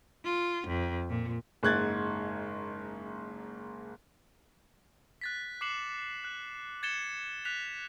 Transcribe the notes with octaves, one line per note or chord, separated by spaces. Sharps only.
F4
F2
A#2
F#1 G#2 F#6 G#6 A6
F#6 A6 B6
D6 F#6 C7 C#7 E7 F#7
F#6
G#6 A6 C#7 E7 G7
F#6 B6 F7